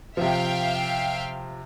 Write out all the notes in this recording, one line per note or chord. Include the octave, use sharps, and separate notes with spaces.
C3 F3 E5 F5 G5